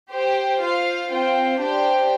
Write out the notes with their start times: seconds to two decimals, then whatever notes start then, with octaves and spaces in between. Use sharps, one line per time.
0.10 G4 C5 G5
0.59 F4 C5 F5
1.09 C4 F4 C5 G5
1.59 D4 G4 C5 G5